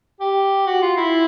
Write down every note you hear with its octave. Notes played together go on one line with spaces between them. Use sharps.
G4
F#4
F4
E4